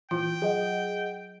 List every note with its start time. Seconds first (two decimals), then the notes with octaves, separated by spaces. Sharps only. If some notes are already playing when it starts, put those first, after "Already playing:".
0.11 A#2 E3 F4 G5
0.42 F#3 G#4 D#5 F#5